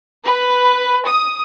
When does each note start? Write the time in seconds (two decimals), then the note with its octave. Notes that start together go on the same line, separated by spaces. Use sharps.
0.25 B4
1.07 D#6